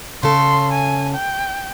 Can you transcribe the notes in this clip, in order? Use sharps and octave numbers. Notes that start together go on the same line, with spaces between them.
C#3 A4 C6
G#5
G5